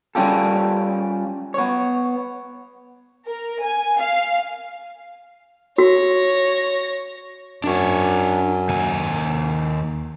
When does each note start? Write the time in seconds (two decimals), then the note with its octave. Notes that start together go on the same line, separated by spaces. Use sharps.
0.15 G3 C#4 F4 G4 A4
1.54 B3 C#5
3.27 A#4
3.63 G#5
3.99 F5
5.78 F#4 C#5 A#6
7.64 F#2 D4 C#5
8.69 D#2 G#5